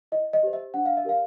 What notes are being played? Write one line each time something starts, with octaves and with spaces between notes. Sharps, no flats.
E4 D#5
D#5
G4 C5
E5
D4 F#5
F5
E5
G4 A#4 D5 F5